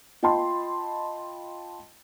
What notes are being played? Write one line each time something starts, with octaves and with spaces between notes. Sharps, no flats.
F4 D#5 G5 A5 B5 C6